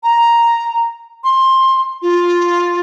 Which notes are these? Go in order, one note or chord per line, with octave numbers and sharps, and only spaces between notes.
A#5
C6
F4